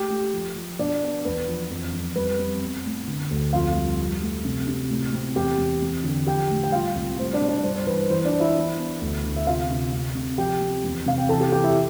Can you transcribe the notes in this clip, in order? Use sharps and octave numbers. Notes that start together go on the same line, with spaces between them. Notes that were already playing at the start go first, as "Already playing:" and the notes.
Already playing: A3 G4 G5
A3
F3
F3
B2 D4 D5
B3
E2 B4
F3
F2
F2
G3 B4
C4
B3
A2
D3
D2
F2 F4 F5
G3
F3
A3
C3
C3
A2
C4
E2 G4 G5
E2
C4
D3
F3 G4 G5
A2
G5
G3 F4 F5
C2
A3 C5
D4 D5
B2
D4 D5
G2 C5
C5
E3 B4
E3 C5
D4 D5
E3
E4 E5
B3
B3
D2
D3
E5
C3 F4 F5
C3
C4
C3
F3 G4 G5
C4
E2
C3 F5
G5
E3 A4 A5
G4 G5
E3 G4 G5
E4 E5